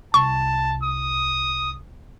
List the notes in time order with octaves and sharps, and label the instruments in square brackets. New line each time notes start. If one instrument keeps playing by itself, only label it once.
[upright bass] C2 [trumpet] A5 [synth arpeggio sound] C#6
[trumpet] D#6